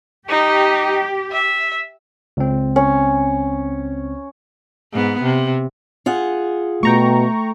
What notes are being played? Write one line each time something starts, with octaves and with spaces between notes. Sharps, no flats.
D#4 G4
E5
C#2 C4
C#4
G#2 B3
C3
F4 G#4 F#5
B2 A3 G5 A#5 C#6